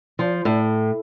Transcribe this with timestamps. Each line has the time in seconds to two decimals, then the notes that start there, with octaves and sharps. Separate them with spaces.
0.19 F3
0.45 A2